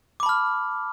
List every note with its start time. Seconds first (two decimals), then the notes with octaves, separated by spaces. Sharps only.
0.20 D6
0.23 B5
0.26 A5
0.29 F6